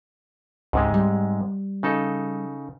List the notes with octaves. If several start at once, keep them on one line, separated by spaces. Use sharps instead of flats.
C#2 G#2 C3 G#3
G3
C#3 D#4 A4